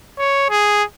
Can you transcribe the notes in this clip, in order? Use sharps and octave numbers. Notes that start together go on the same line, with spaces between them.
C#5
G#4